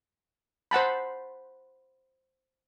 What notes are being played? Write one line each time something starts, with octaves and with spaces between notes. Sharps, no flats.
C5 F#5 A5 B5